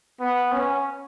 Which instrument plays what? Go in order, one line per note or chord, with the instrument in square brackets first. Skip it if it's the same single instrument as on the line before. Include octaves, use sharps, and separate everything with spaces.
[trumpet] B3
C#4